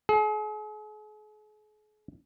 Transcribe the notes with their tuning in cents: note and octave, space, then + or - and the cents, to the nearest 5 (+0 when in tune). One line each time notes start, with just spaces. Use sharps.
G#4 +40